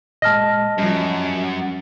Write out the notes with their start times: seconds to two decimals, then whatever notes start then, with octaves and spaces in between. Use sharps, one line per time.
0.22 A#2 G#3 D#5 A5 F6 A#6
0.78 F#2 F3 G3